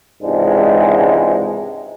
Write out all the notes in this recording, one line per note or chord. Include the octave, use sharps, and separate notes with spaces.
C#2 G#2 C3 E3 G#3 D4